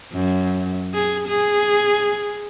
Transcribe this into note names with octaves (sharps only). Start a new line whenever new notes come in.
F#2
G#4
G#4